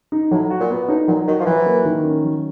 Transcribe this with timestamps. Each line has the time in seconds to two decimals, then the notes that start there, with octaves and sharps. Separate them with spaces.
0.12 D#4
0.31 A2 F#3
0.50 F#4
0.60 A#2
0.70 B3
0.88 A2 D#4
1.08 A#2 F#3
1.27 D#3 F#4
1.40 F3
1.46 E3 F#3
1.66 A#3
1.85 D#3
2.04 C#4
2.24 F#3